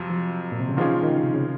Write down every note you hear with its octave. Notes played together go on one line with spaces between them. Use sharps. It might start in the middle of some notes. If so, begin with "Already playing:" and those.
Already playing: F2 C3 F#3
F3
A#2
C3
C#3
A#2 D#3 F3 G#3 C#4 F4
D#3
C#3
C3
C#3